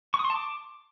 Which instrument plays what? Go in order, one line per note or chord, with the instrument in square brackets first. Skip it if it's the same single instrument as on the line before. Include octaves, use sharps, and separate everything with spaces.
[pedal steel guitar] C#6
D#6
C6
A5
D6